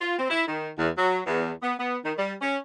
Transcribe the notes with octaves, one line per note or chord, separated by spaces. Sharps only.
F4
C4
E4
D#3
E2
F#3
E2
B3
B3
D#3
G3
C#4